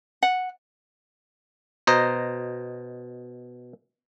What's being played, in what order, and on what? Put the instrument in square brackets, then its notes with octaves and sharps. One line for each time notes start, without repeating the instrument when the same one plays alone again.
[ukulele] F#5
[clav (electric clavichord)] B2 C5 D#5 A#5